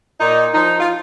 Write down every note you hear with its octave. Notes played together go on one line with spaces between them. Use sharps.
A#2 D#4
F3 D#4
F4